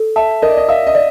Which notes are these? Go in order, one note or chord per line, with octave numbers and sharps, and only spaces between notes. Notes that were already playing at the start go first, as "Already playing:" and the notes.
Already playing: A4
E5 A5
A#4 D#5
D5
D#5
E5 F5
D#5
D5